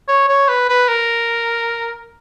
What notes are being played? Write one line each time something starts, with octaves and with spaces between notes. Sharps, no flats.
C#5
C#5
B4
B4
A#4